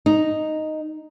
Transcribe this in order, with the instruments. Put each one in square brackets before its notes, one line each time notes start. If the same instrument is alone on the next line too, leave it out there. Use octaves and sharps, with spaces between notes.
[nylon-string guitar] D#4